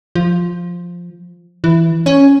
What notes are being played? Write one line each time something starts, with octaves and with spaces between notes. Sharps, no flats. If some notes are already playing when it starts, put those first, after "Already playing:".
F3
E3
C#4